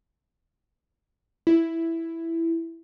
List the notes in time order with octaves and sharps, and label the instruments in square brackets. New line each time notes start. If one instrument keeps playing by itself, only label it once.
[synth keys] E4